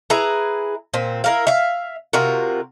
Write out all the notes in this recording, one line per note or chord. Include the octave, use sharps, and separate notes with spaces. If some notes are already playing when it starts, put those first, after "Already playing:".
E4 G#4 B4 A#5
A#2 C4
E4 A#4 F5
E5 F5
C3 F4 F#4 A#4